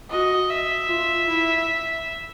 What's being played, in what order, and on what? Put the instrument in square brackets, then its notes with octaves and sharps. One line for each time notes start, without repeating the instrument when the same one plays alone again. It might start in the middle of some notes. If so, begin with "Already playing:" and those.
[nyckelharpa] F#4 [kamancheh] D#5
[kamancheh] E5
[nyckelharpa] F4
E4